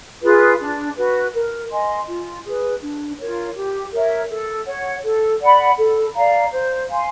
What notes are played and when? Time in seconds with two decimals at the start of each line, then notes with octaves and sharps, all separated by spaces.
0.23 F4 G#4 B4
0.60 D4
0.97 F#4 B4
1.34 A#4
1.71 D#5 G#5 C6
2.08 F4
2.44 G#4 B4
2.82 D4
3.18 F4 A#4 C#5
3.55 G4
3.92 A#4 C#5 E5
4.30 A4
4.67 C#5 F#5
5.03 A4
5.40 D5 F#5 B5
5.77 A4
6.14 D5 F5 A#5
6.52 C5
6.88 F5 G#5 C6